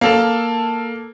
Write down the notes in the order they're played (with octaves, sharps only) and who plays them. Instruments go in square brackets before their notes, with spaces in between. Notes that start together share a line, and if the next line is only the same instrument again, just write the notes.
[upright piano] A#3 A4 A5